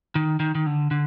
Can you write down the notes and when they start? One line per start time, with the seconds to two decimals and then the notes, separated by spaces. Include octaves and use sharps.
0.15 D#3
0.40 D#3
0.55 D#3
0.66 D3
0.91 D3